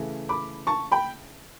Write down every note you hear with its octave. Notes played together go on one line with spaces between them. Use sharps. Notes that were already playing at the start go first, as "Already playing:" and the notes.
Already playing: C#3 E3 A3
B5 D6
A5 C#6
G5 B5